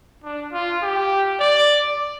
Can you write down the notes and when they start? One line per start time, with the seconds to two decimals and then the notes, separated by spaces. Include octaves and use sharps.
0.24 D4
0.53 F4
0.82 G4
1.40 D5